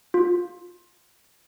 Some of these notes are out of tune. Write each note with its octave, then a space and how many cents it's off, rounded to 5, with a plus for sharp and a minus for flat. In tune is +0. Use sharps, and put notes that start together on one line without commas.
F4 +20